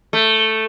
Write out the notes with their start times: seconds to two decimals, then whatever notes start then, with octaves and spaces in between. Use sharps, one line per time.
0.13 A3